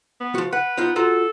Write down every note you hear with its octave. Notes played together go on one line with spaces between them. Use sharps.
B3
F3 F#4
B4 F#5
B3 D#4 F4
F4 F#4 A4 A#5